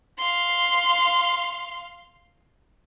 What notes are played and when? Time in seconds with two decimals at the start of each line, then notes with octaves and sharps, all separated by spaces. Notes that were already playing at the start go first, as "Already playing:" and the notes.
0.17 F5 C6